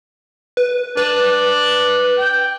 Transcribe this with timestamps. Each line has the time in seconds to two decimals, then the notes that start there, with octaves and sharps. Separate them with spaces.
0.57 B4
0.97 D4 B4
2.18 G5